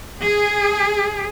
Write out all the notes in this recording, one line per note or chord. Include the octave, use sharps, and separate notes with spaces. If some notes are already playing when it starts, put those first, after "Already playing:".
G#4